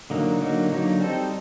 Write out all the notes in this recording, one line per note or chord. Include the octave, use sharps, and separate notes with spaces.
D3 F#3 A#3 D#4
D3 F#3 A#3 D#4
D3 F#3 A#3 D#4
G3 C4 D#4 A4 C5